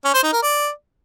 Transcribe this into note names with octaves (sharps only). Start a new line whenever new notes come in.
C#4
C5
D#4
A#4
D5